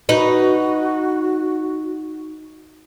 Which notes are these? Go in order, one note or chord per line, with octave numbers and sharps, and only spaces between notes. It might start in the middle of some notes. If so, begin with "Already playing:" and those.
D#4 F#4 B4